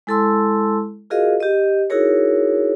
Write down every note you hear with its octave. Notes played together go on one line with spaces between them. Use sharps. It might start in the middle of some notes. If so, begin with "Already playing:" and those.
G#3 E4 A4 A5 C6 E6
F4 F#4 G#4 A#4 D#5 F5
G4 D#5
D#4 E4 F#4 G#4 A#4 C#5